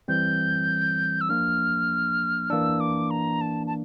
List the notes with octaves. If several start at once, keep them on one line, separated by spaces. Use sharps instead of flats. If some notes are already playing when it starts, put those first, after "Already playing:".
E3 G3 C4 G6
E6
F3 A#3 D4 F6
E3 A#3 D4 E6
D6
A#5
A5
A5